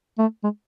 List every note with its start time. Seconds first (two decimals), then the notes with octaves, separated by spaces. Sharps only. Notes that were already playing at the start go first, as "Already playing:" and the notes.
0.18 A3
0.44 G#3